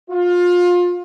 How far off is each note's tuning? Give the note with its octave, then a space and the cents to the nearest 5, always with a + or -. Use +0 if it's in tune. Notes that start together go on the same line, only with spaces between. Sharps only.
F4 +25